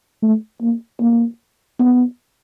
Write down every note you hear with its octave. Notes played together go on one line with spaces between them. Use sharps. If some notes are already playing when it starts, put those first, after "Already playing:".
A3
A#3
A#3
B3